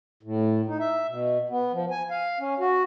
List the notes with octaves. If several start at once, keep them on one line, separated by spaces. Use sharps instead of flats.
A2
D#4
E5
B2
B3
F3
G#5
F5
C#4
F#4